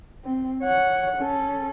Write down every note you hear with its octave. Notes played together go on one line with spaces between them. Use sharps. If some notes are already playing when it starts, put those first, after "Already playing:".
C4
C#5 F#5
C#4 A4